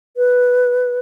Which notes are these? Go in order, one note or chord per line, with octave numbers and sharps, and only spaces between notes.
B4